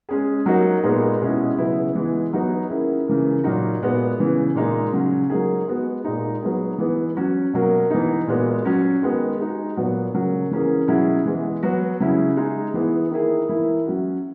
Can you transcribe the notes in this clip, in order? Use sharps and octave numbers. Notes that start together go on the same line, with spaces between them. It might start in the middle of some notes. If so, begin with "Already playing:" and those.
G#3 C#4 G#4
F#3 A#3 D#4 F#4
A#2 G#3 B3 D#4 G#4
B2 G#3 C#4 E4
C#3 F#3 B3 E4 G#4
E3 G#3 B3 E4
F#3 B3 D#4 F#4
D#3 A#3 C#4 E4 G#4
C#3 E3 A#3
A#2 F#3 A#3 D#4 F#4
A#2 G#3 B3 F#4
C#3 E3 B3
A#2 G#3 D#4
C#3 F#3 C#4
F#3 A#3 D#4 G#4
G#3 B3 F#4
A#2 G#3 D#4
F#3 B3 D#4 G#4
E3 G#3 B3
F#3 C#4 F#4
B2 F#3 A#3
E3 B3 D#4
A#2 G#3 B3 F#4
F#3 C#4 F#4
D#3 G#3 B3 F#4
G#3 D#4 F#4
A#2 F#3 B3 F#4
C#3 F#3 A#3
E3 A#3 C#4 G#4
B2 F#3 C#4 E4 G#4
E3 G#3 B3
F#3 B3 F#4
C#3 F#3 C#4 E4 G#4
G#3 D#4 G#4
E3 B3 E4 G#4
D#3 A#3 E4 G#4
E3 A#3 E4
F#3 C#4 F#4